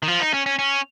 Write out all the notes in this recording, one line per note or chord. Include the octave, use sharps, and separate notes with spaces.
D#3
F3
D#4
C#4
C#4
C#4